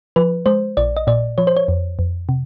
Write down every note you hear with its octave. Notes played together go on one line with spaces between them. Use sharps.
F3 B4
G#3 C5
A#1 D5
D#5
A#2 D5
F3 C#5
C5
C#5
F2
F2
C3